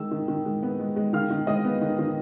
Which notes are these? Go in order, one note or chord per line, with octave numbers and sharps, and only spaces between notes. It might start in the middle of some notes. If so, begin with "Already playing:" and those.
Already playing: D#3 G#3 E6
D#3
D#3
G#3
B3
G#3
G#3
D#3 F5 F6
D#3
G#3 D#5 D#6
B3
D#3
D#3